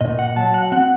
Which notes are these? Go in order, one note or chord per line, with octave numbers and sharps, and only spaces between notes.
A#2 D#5
F#5
F#3 A5
F#5
C4 F#5